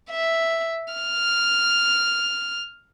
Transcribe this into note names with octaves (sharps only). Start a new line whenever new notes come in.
E5
F6